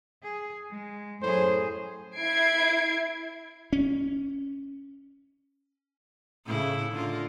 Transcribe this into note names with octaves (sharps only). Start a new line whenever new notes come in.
G#4
G#3
F#2 A2 G#4 C5
E4 G#6 C7 D7
C#4
A2 C#3 E4
D3 F4 A#4